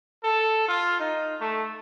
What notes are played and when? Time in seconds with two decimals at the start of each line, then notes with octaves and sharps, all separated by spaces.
0.23 A4
0.68 F4
1.00 D#4
1.40 A3